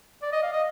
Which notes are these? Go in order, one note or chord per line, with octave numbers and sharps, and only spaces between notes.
D5
D#5
F5
D#5